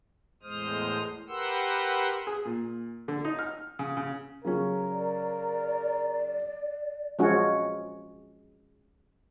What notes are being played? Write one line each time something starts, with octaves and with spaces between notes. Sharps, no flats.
E2 A2 G#3 C5 D#6 F6
G4 A#4 B4 F#5 C6 E6
G#4
A#2
D3
D#4
F6
C#3
C#3
C#3 F#3 C#4 A#4
D5
F3 G#3 C#4 F#4